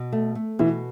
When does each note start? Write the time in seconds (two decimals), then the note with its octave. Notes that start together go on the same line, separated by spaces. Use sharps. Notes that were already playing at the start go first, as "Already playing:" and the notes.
Already playing: B2
0.12 A3
0.35 A3
0.59 B2 E3